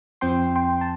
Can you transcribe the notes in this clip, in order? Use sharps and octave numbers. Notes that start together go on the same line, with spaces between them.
F2 F3 C4 G5 C6
G5 C6
A5